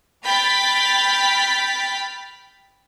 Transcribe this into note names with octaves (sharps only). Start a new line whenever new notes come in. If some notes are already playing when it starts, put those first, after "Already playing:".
G5 B5 F6 G6 A6 B6